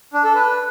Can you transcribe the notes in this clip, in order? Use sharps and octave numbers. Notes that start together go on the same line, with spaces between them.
D4
A4
B4